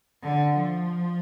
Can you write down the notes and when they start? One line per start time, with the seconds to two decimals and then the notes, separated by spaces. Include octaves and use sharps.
0.23 D3
0.55 F3